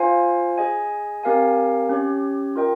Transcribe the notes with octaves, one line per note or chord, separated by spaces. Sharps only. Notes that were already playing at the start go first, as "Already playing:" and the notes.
Already playing: F4 C5 F5 G#5
G#4 D#5 G#5
C4 G4 A#4 F5 G#5
C#4 G4 C#5
F4 A#4 D#5 G5